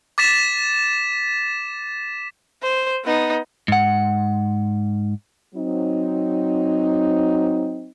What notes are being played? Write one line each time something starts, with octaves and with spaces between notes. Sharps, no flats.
D6 A6 B6 E7
C5
B3 D#4
G#2 F#5
F#3 C4 D#4